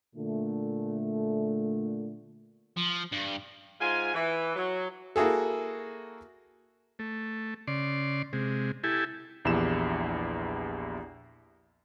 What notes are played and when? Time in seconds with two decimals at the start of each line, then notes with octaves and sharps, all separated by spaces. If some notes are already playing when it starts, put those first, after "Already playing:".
0.15 A#2 D3 A3
2.77 F3
3.12 G2
3.81 G#2 F4 G#5
4.14 E3
4.56 F#3
5.16 A#3 E4 F#4 G#4 A4
6.99 A3
7.67 C#3 D5 C6
8.33 C3 G#3
8.84 E4 G4 A4 G#5
9.45 A#1 E2 E4 G4 E7